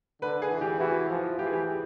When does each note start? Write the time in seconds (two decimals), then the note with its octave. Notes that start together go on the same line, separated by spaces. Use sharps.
0.22 D3 B4
0.42 G#4
0.51 E3
0.61 G4
0.80 E3 F#4
1.10 F3
1.39 E3 G4
1.46 G#4
1.53 G4